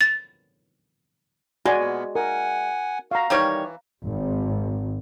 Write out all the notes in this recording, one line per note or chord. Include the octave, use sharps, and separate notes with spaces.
A6
G#3 F#4 D5 G#5
A#2 B3
A#4 F#5 G#5
F#4 F5 A#5
D#3 E3 G3 C#5
G#1